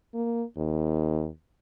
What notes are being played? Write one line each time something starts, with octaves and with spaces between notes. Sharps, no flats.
A#3
D#2